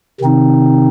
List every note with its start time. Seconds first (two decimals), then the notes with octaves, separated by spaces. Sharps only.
0.21 C3 D#3 C4 D#4